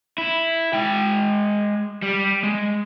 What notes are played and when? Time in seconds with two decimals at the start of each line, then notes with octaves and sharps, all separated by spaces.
0.18 E4
0.73 G#3 G5
2.02 G3
2.43 G#3